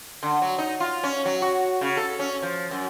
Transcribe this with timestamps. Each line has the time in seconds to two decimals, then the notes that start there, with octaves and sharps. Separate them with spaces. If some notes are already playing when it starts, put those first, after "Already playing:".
0.23 D3
0.42 F#3
0.58 D#4
0.80 F4
1.03 C#4
1.25 F#3
1.42 F#4
1.81 C#3
1.97 A4
2.19 C#4
2.42 F3
2.71 F#2